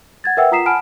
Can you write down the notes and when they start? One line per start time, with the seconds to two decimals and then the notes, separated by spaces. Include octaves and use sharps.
0.24 F#5 G#6 A6
0.37 A#4 B4 E5 F#5 G5 E6
0.52 F4 A#5 D#6 B6 C7 E7
0.66 F#5 G#5 A5 B5 F6 D7